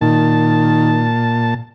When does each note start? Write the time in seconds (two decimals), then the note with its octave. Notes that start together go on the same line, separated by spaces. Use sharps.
0.01 A#2 D#3 A5